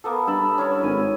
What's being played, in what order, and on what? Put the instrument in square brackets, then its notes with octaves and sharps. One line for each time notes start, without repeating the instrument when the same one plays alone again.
[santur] A#3 B3 A4
[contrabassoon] G2 [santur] E5 A5 B5
[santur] C#4 E4 C#5
[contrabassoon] G#1 [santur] G#5